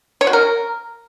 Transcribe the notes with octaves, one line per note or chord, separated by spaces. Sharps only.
C#5
F#4
A#4